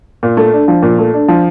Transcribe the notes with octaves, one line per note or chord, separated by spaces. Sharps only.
A#2
A3
D4
F3
A#2
A3
D4
F3